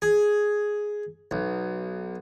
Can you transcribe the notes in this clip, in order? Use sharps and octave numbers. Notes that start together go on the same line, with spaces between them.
G#4
B1